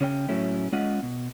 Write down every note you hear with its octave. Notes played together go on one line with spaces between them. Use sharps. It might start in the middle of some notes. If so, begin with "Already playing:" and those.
C#3 C#4 C#5 G5
A2 F#3 A3 C#4 E4
G#3 C#4 F4 D#5 F#5
B2